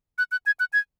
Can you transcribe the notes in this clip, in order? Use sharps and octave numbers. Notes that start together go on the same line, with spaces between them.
F#6
F#6
G#6
F#6
G#6